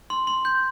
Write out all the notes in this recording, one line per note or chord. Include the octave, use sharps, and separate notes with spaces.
C6
C6
G6